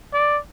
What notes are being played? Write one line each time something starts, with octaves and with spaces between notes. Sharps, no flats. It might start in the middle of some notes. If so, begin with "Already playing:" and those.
D5